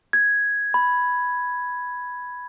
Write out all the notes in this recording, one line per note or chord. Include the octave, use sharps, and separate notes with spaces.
G#6
B5